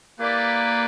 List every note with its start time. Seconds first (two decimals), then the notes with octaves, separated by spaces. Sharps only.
0.19 A#3 E4 G4 B4 D5